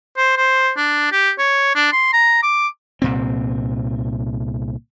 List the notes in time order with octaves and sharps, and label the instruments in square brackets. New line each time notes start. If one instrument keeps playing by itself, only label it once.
[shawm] C5
C5
D4
G4
C#5
D4
C6
A#5
D6
[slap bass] C2 A#2 C4